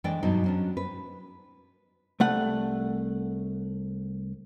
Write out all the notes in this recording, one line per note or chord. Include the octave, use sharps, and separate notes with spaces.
E3 G#3 A3 D4 D5 G5
G2 B2 F#3 B3 D#4
F#3 C#4 D4
B4
C2 A3 F#5